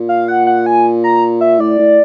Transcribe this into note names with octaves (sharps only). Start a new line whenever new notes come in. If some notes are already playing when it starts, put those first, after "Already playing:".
Already playing: A#2
F5
F#5
F#5
G#5
A#5
E5
A2 D5
A2